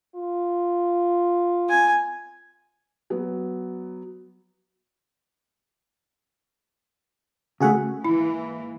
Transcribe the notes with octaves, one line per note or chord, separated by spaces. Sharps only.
F4
G#5
F#3 B3
C#3 A3 F#4 G#4 F#5
G#2 E3 A#3 E4